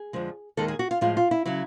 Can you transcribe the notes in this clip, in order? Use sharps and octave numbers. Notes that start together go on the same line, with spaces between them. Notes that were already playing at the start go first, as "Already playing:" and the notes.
Already playing: G#4
F2 D3 F3 G#3
D#2 D#3 G#3 A4
G#4
F#4
F4
A2 F3 G#3 F4
F4
E4
C#3 F#3 E4